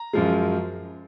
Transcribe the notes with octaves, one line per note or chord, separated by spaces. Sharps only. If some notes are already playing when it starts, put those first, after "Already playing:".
Already playing: A#5
F#2 F3 G#3